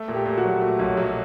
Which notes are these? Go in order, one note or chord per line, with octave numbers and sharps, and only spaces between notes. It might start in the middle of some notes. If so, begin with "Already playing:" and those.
Already playing: A3
A#2
G4
A#2
F#4
F#3
A3
B1
F#3